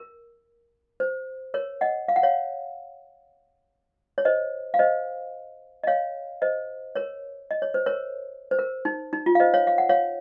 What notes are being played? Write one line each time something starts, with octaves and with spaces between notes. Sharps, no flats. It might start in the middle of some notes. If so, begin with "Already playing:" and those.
Already playing: A#4
C5
A#4 C#5
D#5 F#5
F5
F#5
C#5 F5
C#5
C5 D#5
F5
C5 D#5
D#5
C#5 F5
C5 D#5
A#4 C#5
D#5
C#5
C5
A#4 C#5
C5
A#4
D#4
D#4
F4
F5
C5 D#5
C#5 F5
F5
F#5
C#5 F5